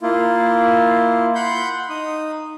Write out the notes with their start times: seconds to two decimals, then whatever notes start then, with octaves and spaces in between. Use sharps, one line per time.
0.02 A#3 E4 F4
1.35 F#5 B5 C6 G6
1.89 D#4 D#6